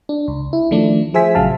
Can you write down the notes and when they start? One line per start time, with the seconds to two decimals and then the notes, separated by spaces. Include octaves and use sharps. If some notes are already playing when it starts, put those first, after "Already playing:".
0.09 D4
0.28 C#2
0.53 E4
0.71 D#3 F3 A3 D4
1.14 F3 G#4 C5 E5 G#5 B6
1.35 A1 C#3 F#3 F5 A5